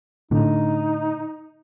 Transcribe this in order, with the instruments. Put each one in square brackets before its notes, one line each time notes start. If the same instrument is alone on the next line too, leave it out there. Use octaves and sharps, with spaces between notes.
[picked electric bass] A2 D3 [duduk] D#4